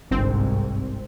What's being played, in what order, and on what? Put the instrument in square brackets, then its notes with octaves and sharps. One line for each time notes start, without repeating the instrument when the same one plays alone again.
[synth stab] G1 C4 [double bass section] C2 G#2